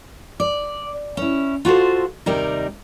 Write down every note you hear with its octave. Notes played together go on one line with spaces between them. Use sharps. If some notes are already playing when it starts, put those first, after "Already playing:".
D5
C#4 E4
F4 F#4 A4 C5
D#2 C3 G3 D#4 A#4